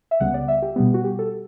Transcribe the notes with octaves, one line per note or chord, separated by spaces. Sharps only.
E5
C#2 C#3 G3 B3 F#5
D5
E5
G4
B2 G3 B3
F#4
G4
A4